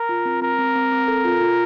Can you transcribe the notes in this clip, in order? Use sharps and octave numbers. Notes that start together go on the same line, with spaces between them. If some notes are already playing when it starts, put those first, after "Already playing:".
Already playing: A#4
F4
C4
C4 A#4
C4
C4
C4
A4
F4
F4